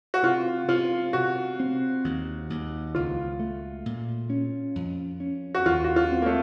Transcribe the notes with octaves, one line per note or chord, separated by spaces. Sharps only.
F#4
C3 F4
C3 F4
C3 F#4
C4
D#2
D#2
C#2 F4
A3
A#2
C#4
F2
C#4
F#4
D#2 F4
F#4
F4
C4
A#3
A3